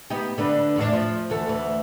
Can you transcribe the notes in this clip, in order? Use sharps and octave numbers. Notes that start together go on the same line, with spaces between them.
B3 D#4 G4
D3 D4 B4
E2 A2 D4
F3
D2 E3 A4
D2 E3